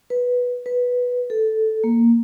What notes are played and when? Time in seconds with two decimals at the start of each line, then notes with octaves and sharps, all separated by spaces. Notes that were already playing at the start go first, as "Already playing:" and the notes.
0.10 B4
0.66 B4
1.30 A4
1.84 A#3